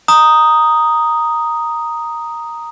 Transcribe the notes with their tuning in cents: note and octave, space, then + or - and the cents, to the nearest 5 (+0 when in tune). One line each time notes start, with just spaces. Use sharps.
A#5 +0 D#6 +0